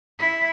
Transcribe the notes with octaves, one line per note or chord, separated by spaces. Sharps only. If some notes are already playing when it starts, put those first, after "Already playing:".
E4